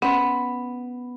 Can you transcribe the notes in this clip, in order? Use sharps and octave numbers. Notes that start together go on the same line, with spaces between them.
B3 C#4 C6